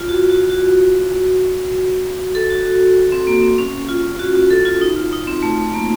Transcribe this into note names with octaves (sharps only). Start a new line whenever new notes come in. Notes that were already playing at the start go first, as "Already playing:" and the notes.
Already playing: F4
F#4
F#4
F#4
A4
F#4
F#4
C4
A#3
C4
C#4
F4
F#4
F#4
A4
F4
D#4
F4
D#4
C4
A3
A3
A#3